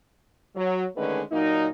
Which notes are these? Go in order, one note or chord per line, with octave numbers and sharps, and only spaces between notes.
F#3
D3 D#3 G#3 A3 C#4 B4
A#2 F#3 A#3 D#4